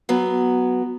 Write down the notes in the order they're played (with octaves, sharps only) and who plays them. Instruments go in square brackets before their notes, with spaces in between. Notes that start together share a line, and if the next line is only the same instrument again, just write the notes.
[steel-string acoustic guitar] F#3 B3